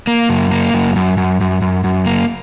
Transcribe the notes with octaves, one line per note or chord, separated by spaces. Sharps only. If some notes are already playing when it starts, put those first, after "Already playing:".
A#3
F#2
A#3
F#2
F#2
F#2
F#2
F#2
F#2
A#3